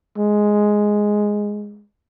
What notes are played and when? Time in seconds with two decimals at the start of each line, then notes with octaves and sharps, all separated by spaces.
0.18 G#3